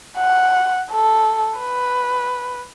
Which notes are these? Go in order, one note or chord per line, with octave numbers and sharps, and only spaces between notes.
F#5
A4
B4